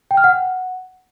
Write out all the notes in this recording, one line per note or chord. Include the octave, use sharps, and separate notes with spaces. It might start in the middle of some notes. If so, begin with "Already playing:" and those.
G5
F6
F#5